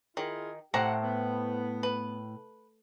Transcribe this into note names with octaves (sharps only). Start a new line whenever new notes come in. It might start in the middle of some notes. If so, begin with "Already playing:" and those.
D#3 E4 F4 G#4
A2 C4 G4 F#5 A#5
B3
B4